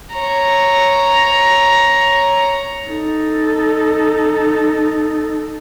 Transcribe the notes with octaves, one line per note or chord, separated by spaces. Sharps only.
C#5 A#5
D#4 A4